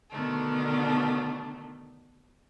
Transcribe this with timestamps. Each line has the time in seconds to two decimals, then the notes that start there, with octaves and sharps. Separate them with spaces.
0.11 B2 D3 D#3 A3 D4